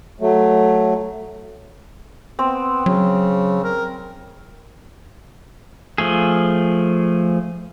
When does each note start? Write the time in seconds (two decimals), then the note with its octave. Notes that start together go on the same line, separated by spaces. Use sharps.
0.20 F#3 A3
2.39 B3 C4
2.86 C#3 F#3
3.64 A#4
5.98 F3 A3 G#4